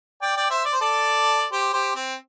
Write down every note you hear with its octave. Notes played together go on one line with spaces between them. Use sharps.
D5 G5
D5 G5
C5 E5
D5
C5
A4 D5
G4 C5
G4 C5
C4